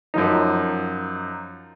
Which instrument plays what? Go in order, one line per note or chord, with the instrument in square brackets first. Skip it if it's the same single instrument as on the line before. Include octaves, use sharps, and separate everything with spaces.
[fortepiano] F#2 F3 D#4